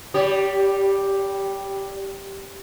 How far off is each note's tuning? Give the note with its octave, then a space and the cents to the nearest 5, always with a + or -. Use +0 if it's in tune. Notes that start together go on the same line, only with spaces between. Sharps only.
G3 +0 G4 -15 C#5 +45